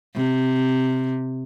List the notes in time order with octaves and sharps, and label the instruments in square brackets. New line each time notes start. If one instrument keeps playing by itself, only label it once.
[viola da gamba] C3